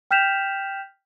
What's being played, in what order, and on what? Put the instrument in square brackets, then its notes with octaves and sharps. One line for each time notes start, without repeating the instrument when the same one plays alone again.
[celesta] G5 F6 G6 B6 E7 F7